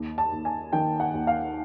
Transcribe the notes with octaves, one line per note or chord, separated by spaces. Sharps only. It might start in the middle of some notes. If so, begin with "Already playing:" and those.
Already playing: D#2
A5
D#2
G#5
D#3 G5
F#5
D#2
F5